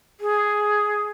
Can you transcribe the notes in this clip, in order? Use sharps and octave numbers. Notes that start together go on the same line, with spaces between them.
G#4